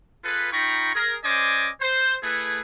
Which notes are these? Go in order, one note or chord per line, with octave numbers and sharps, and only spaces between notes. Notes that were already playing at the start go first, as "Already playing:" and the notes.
F4 G#4 A4 B4
D#4 F4 G5 A#5 B5 C#6
G#4 A#4
C#4 C5 D5 D#5 G#5 D6
C5
A3 E4 G#4 A4 B4